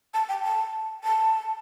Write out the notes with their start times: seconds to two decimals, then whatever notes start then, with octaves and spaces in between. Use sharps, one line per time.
0.14 A5
0.29 G5
0.44 A5
1.04 A5